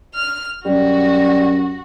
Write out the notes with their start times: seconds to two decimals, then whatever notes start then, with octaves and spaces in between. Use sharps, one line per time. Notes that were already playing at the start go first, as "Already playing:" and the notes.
0.15 F6
0.65 F#2 G3 F#4